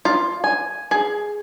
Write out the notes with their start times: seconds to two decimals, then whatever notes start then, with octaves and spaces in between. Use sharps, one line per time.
0.05 F4
0.44 G#5
0.91 G#4